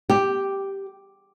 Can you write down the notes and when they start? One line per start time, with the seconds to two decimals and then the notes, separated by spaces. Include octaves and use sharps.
0.10 G4